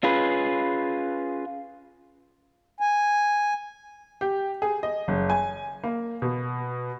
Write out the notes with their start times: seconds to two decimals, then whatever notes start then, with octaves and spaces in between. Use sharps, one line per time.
0.03 C#4 F4 G#4 B4
2.81 G#5
4.21 G4
4.62 G#4
4.83 D#5
5.08 F#1
5.30 G#5
5.84 A#3
6.22 B2